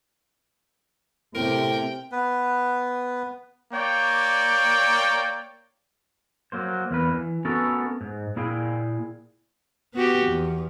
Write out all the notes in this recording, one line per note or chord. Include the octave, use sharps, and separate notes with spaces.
A2 C3 A#4 G5
B3 B4
A#3 C#5 D5 G5
F#3 A#3 C5
E2 A#3 B4
E3
A3 B3 C#4 F#4 A4 A#4
G#2
A#2 E4 G#4 F5 G5
B3 F#4 G4
E2